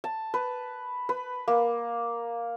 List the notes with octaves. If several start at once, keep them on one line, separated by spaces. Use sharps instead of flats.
A5
B4
B4
A#3